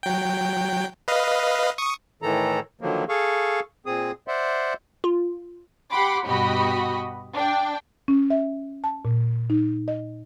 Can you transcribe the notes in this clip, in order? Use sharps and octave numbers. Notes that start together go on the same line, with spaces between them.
F#3 G5
B4 D#5 F5
C#6 D#6
A2 D#3 E3 A4 A#5
D3 D#3 F3 F#3 A#3
G#4 A4 F5 C#6
A#2 C4 G#4 D#6
C5 D5 E5 F#5 C6
F4
G4 F#5 B5 C6 D6
G2 B2 F#4 G4 D#5 B5
D4 G5
C#4
E5
A5
A#2
D#4
D#5